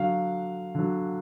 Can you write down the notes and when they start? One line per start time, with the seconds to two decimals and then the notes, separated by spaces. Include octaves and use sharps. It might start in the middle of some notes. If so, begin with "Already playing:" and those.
Already playing: D3 F#3 F5
0.75 D3 F#3